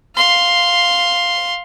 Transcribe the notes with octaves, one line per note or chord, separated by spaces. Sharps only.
F5 C6